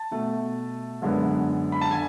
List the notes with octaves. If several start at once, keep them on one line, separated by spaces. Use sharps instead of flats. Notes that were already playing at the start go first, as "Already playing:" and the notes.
Already playing: A5
B2 A3
F#2 D3 G#3 B3
B5
A5
D3 G#5